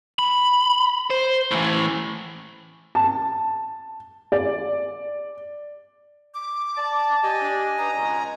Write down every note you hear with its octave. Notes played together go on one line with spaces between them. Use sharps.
B5
C5
A2 E3
A5
D5
D6
D5 A5
G4 D#5 G#5
D4
D4 D#4 B4 A#5
C#2 B2 G#3